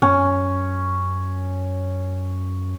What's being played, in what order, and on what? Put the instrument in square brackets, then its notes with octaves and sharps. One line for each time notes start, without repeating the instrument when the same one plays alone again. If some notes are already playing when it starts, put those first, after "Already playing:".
[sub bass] F#2 [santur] C#4